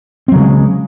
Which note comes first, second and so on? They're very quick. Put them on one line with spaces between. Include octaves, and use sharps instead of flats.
C4 F#3 C#3 G#3